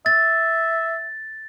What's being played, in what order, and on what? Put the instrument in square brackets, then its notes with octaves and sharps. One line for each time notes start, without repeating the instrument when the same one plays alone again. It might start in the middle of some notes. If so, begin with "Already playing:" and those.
[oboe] E5 [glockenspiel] A6